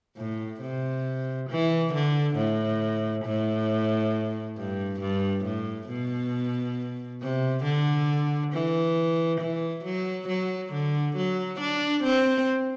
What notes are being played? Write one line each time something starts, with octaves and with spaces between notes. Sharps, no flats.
A2
C3
E3
D3
A2
A2
G2
G2
A2
B2
C3
D3
E3
E3
F#3
F#3
D3
F#3
D4
C4